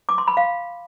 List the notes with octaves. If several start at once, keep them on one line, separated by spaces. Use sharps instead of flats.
D6
C6
B5
F5